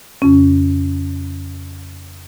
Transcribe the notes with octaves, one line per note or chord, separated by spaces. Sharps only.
F2 C#3 C#4